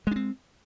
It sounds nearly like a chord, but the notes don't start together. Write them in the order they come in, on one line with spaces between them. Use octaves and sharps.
G#3 D4 C4